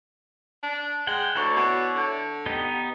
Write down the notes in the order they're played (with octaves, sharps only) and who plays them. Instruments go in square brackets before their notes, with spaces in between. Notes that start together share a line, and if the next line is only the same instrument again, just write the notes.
[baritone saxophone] D4
[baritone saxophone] G#3 [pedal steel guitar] F#5 G5
[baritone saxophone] D2 [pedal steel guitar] E4 C#5 D5
[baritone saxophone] B2
D3
[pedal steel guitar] B3 D#4 G4